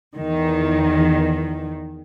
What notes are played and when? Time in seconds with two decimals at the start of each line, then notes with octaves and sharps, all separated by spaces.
0.16 E2 D#3